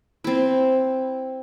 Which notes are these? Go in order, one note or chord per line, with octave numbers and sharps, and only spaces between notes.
C4 E4